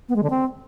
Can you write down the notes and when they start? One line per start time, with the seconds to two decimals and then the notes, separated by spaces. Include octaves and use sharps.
0.09 B3
0.16 G#3
0.23 D3
0.30 C4